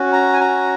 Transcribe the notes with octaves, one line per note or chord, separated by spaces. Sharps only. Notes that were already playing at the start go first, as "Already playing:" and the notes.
Already playing: C#4 F#4
A#5
G#5
A#5